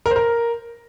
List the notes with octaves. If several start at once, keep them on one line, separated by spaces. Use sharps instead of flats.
A#4
C5
A#4